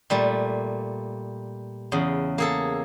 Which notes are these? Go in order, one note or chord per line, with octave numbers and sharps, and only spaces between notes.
A#2 G3 A3
E2 C#3
A#3 G#4 A4